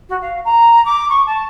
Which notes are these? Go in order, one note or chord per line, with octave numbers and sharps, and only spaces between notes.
F#4
F5
A#5
D6
C#6
A5